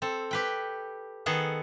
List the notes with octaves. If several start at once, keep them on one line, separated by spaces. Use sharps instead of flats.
C4 A4
G4 B4 G5
D#3 B3 G#4 A4 F#5